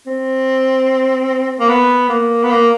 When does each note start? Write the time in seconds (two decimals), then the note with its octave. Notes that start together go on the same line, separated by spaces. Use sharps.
0.07 C4
1.60 A#3
1.69 B3
2.09 A#3
2.43 B3
2.51 A#3